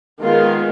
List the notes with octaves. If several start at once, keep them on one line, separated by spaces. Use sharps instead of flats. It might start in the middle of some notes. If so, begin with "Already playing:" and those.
D#3 G#3 B3 F4